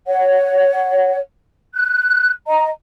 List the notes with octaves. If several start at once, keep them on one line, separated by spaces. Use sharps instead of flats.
C#5 F#5
F#6
D#5 A#5